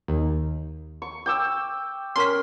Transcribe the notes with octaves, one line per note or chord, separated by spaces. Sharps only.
D#2
C#6
G5 D6 E6
C#4 A#4 C6 B6